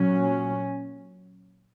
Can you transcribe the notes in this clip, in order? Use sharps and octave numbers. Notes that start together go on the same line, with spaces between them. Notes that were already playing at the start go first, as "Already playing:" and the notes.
Already playing: A#2 F#3 C#4